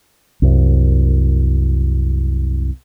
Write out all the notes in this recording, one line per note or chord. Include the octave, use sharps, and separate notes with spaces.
C2 F#2